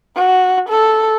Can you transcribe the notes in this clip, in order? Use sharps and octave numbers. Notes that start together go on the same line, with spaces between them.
F#4
A4